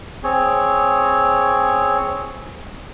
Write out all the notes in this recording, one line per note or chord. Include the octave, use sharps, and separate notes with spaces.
C4 G#4 C#5